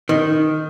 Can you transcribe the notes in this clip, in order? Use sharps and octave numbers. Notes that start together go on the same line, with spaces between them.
D#3